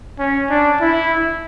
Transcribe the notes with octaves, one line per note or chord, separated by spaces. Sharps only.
C#4
D4
E4